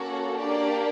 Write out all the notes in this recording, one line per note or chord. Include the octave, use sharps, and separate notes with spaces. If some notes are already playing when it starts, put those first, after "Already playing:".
Already playing: A#3 C#4 F#4 A4
A#3 D4 G4 D5